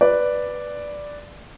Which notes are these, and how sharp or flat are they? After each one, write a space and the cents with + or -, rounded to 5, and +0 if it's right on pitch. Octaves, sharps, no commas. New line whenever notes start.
B4 +0 D5 +0